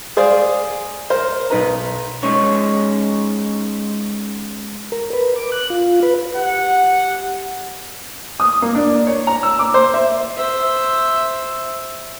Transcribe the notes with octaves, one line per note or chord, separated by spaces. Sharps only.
G#4 C5 D5 F5
A#4 C5
B1 D#4 B4 A#5
G#3 C#4 D#4 C#5
A#4
B4
D6
F#6
F4
B4
G4 F#5
D#6
A#3
D4
C#5
A#5
E6
D6
C5
E5
C5 E5